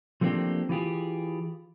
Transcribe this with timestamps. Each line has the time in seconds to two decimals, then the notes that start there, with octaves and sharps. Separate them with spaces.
0.21 F3 A3 A#3 C4 D4 G4
0.69 E3 F4 G4 G#4